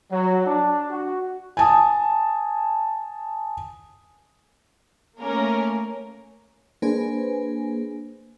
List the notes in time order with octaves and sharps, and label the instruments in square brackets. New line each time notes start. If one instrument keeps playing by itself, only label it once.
[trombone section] F#3
D4
F#4
[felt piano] G#5 A5 D#6
[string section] A3 A#3 C#4 A#4
[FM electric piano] A#3 D4 G#4 B4 C5 G#5